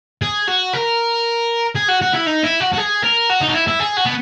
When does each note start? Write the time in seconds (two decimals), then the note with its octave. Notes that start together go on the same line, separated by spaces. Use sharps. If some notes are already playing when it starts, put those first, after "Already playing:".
0.22 G#4
0.48 F#4
0.73 A#4
1.75 G#4
1.88 F#4
2.02 F#4
2.14 E4
2.27 D#4
2.44 E4
2.60 F#4
2.73 F#4
2.77 G#4
3.04 A#4
3.30 F#4
3.41 D#4
3.48 F#4
3.54 E4
3.67 E4
3.80 G#4
3.97 F#4
4.05 B3